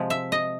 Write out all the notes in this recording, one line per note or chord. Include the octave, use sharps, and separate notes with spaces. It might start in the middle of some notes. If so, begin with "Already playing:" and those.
Already playing: C3 F3 G#3
E5
D#5